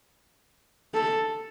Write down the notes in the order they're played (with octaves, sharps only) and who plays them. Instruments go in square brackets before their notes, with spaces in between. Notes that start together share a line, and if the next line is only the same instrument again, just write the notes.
[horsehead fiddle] A4